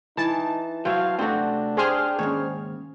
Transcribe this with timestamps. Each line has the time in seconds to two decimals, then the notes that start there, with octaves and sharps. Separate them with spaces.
0.17 E3 D#4 A5
0.85 F#3 C4 C#5 F5
1.19 C3 A3 C4 D4 F#4
1.77 G4 G#4 C5 F6
2.19 D#2 G#2 C#3 C#5